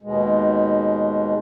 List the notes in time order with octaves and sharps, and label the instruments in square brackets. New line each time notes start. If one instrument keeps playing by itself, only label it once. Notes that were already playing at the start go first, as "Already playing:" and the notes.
[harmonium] D#2 B2 G#3